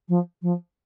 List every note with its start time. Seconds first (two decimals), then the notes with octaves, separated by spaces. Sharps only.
0.08 F3
0.42 F3